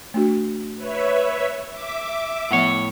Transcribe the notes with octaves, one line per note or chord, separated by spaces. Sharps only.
A3 D4 F#4
B4 C#5 E5
E5 D6
A2 F3 B3 C#5 F#5